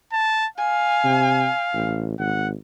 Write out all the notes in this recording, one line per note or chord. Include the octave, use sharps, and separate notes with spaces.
A5
F5 G#5
C3
A1
G#1 F#5